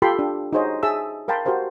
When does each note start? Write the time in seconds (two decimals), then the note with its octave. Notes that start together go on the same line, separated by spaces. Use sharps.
0.02 F4 G4 A4 G5 B5 C6
0.19 D4
0.53 D#4 F#4 G#4 C5 C#5 D#5
0.83 G#4 E5 A5 E6
1.28 A#4 F5 G5 A5 B5 C6
1.45 F#4 G4 A#4 C5 F5